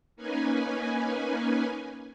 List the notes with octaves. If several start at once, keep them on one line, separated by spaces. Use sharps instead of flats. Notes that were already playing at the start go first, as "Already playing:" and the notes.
A#3 C#4 D#4 B4 G#5